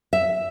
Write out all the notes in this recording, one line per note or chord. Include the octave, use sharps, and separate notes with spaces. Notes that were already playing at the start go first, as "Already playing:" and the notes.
E5